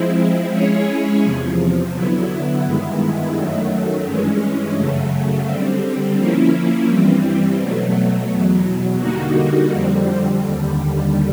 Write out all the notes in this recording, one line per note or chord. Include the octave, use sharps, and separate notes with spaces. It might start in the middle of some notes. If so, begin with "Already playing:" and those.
Already playing: F3 G#3 C4 E4
G#3 C#4 E4 G#4 C#5
E2 C3 F3
D3 F#3 B3 E4
G2 D#3 G#3 B3 E4
F#2 D#3 F#3 A3
G2 E3 G#3 C#4
F#2 C#3 F#3 A3
D3 G3 C4
F3 A#3 C#4 E4
G2 E3 G3 C4
B2 F#3 A3
E2 B2 F#3
D3 G3 A#3 D#4 F#4
F2 D3 G3 C4
D#2 D3 G3